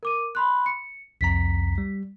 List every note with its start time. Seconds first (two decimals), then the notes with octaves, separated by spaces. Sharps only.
0.03 A#4 D6 D#7
0.35 B5 C6 F#6
0.66 C#7
1.21 C2 F2 A#5 B6
1.78 G3